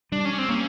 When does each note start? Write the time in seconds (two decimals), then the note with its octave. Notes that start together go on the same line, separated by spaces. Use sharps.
0.12 G3 D4
0.25 C#4
0.38 C4
0.49 A#3 C#4